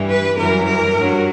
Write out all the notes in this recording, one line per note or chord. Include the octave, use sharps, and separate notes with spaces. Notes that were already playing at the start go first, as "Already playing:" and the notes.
Already playing: G2 E3 G3
B4
F#2 E3 G3 A#4
A#4
G2 F#3